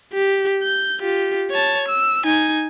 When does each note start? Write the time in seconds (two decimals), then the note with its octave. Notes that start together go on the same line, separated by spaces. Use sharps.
0.13 G4
0.63 G6
1.01 F4 G4
1.51 C#5 A5
1.88 E6
2.25 D#4 G#5